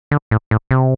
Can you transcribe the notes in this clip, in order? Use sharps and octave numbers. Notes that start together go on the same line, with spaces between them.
D3
A2
A2
C3